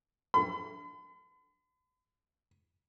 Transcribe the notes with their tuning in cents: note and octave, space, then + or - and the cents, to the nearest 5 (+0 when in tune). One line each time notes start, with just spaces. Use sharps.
B5 +45